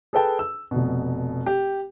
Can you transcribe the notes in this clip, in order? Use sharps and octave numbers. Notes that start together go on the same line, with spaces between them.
G#4 A4 B4 G5 A5
E6
F1 B2
G4